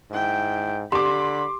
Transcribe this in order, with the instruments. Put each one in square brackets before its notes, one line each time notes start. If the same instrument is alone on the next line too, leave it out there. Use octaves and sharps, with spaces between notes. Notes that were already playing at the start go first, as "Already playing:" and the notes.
[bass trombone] G#2 [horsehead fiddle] E4 G5
[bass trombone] D3 [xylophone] G4 [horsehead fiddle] B5 [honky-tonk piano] C6 D6